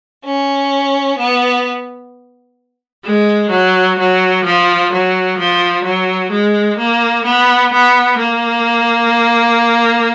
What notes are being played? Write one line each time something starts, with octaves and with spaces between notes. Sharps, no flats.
C#4
B3
G#3
F#3
F#3
F3
F#3
F3
F#3
G#3
A#3
B3
B3
A#3